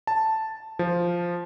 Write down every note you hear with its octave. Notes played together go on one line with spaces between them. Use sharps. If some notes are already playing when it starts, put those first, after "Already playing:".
A5
F3